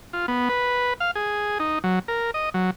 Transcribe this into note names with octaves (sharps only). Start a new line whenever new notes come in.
F4
B3
B4
F5
G#4
D#4
F#3
A#4
D#5
F#3